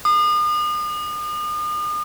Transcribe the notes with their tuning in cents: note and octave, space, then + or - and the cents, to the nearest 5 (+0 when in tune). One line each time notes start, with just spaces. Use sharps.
D#6 -40